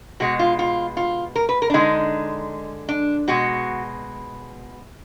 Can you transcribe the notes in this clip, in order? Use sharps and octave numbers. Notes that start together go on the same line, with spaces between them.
B2 G#3 F#4
F4
F4
F4
A#4
B4
A#4
D4
D3 G#3 D#4
D4
B2 G#3 F#4